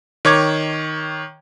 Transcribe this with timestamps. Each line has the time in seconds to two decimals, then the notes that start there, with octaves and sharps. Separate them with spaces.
0.25 D#3 C#5 D6 G#6